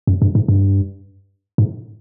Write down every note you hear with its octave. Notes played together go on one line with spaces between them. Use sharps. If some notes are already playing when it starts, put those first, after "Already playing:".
F#2
G2
G#2
G2
G#2